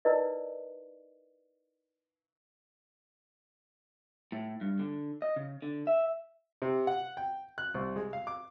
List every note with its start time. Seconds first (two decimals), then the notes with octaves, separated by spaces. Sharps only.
0.05 D#4 E4 A#4 B4 D5 D#5
4.32 A2
4.61 G2
4.79 D3
5.22 D#5
5.36 C#3
5.62 D3
5.87 E5
6.62 C3
6.87 F#5
7.17 G5
7.58 F#6
7.74 C2
7.96 G#3
8.13 F5
8.27 D6